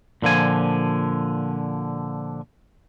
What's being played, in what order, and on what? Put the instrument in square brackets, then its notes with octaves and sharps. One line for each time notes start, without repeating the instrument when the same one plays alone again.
[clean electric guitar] A#2 D3 F3 G#5